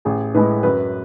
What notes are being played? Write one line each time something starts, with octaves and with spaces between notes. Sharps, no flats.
A1 G#4
A2 G#3 B4
F#2 B4